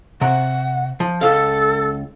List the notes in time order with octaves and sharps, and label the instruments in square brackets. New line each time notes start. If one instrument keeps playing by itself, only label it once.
[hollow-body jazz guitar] C3 [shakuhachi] F#5
[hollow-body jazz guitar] F3
[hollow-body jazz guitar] C#2 F5 [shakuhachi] A4